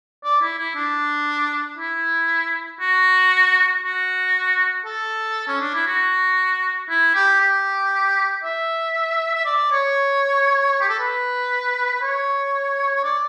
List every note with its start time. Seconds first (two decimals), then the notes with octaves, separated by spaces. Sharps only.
0.25 D5
0.42 E4
0.59 E4
0.76 D4
1.78 E4
2.81 F#4
3.83 F#4
4.85 A4
5.48 C#4
5.61 D4
5.74 E4
5.87 F#4
6.90 E4
7.15 G4
7.41 G4
8.44 E5
9.35 E5
9.46 D5
9.72 C#5
10.81 G4
10.90 A4
10.99 B4
11.95 B4
12.02 C#5
12.95 C#5
13.04 D5